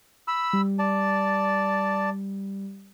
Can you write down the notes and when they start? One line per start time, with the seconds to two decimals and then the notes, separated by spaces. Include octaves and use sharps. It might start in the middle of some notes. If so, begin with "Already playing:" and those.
0.28 B5 E6
0.53 G3
0.79 D5 A5